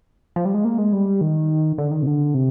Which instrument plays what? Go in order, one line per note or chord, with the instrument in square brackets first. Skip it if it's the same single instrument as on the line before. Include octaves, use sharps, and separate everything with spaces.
[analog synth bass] F3
G3
G#3
A#3
G#3
G3
D#3
D3
D#3
C3
D3
C3